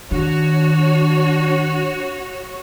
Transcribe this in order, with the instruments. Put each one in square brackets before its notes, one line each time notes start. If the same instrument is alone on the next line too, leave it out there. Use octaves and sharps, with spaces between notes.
[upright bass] D#3 [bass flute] D4 [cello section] F#4 C#5